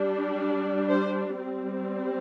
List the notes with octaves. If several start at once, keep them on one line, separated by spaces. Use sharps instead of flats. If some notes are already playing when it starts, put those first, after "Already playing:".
Already playing: G3 D4
C5
G3 C4